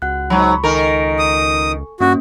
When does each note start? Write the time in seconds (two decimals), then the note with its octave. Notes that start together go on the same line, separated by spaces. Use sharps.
0.02 C#2 F#4 F#5 F#6
0.30 G#2 F#3 B5 C#6
0.64 D#3 A4 A#4 G#5 C#6
1.19 D#6
2.00 G2 A#3 C#4 F#4